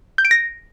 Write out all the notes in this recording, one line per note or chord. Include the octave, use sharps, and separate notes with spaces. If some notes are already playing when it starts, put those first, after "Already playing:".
G6
D7
A#6